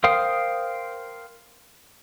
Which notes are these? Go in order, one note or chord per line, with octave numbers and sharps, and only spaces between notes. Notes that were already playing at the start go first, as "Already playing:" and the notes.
A#4 C5 F5 G5 D#6